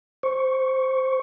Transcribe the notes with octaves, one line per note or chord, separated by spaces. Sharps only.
C5 C#6